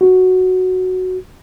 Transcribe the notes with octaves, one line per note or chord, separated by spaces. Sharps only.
F#4